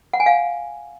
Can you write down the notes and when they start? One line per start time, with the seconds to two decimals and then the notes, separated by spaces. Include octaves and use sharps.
0.13 F#5
0.20 G#5
0.26 F5